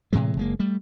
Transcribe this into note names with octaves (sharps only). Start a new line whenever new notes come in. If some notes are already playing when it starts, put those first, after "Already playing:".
A2 C3 E3 G#3
F#1 G#3 A#3
G3 A3